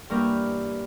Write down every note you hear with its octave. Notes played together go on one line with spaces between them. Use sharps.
G2 E3 A#3 G4 A#4 C#6